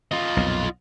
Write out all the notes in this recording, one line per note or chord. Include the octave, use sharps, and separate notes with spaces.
F4 D#5
B1 F2 A#2